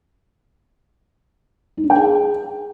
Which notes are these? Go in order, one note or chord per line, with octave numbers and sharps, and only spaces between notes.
D#4
D4
G5
G#4